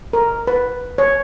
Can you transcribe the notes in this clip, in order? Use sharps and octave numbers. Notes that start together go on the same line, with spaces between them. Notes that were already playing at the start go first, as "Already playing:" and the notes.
A#4
B4
C#5